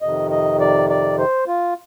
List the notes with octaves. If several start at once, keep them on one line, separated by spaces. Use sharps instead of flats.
F2 C3 D#3 D#5
D#5
D5
D5
C5
F4